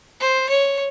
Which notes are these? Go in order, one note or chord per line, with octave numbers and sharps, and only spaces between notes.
C5
C#5